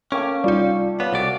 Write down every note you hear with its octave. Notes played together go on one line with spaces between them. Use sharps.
A3 A#3 C#4 G5 D7
C2 G3 D#4 F4 D5
B3 C#5 D5 F5
C2 F#4 D5 F5